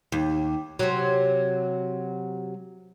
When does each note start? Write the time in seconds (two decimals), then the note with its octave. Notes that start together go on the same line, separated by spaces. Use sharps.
0.12 D#2
0.79 C3 F#3